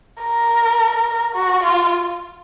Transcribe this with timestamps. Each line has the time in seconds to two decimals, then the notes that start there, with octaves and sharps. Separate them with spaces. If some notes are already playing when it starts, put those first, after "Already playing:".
0.21 A#4
1.35 F#4
1.63 F4